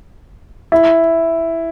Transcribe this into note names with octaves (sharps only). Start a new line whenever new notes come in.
E4